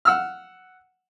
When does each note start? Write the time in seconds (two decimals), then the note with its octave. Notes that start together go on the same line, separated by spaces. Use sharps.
0.05 F#5 E6 F6